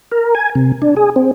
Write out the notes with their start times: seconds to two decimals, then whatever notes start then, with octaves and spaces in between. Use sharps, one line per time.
0.12 A#4
0.35 G#5
0.55 C3
0.82 D4
0.97 G#4
1.16 C4